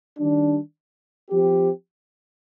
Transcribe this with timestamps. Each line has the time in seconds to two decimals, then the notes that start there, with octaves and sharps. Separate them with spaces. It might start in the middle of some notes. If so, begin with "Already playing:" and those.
0.19 D#3 G3 D4
1.30 F3 C4 G4